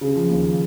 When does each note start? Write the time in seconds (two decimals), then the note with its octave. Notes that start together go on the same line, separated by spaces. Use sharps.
0.01 C#3
0.15 F3
0.30 D#2